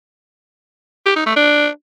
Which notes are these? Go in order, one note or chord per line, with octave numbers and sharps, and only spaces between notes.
G4
D#4
A3
D4